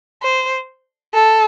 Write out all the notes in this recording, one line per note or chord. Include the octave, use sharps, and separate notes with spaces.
C5
A4